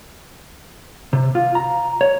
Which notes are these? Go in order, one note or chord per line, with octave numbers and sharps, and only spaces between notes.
C3
F4
A#5
C#5